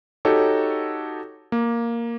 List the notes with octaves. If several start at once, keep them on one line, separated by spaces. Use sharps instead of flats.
D#4 F#4 G4 A4 C#5
A#3